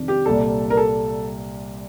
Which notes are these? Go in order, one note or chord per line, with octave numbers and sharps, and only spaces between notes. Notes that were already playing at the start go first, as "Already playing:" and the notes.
Already playing: F2 C3 D#3 D4
G4
C2 A#2 G3 A4
A#4
A4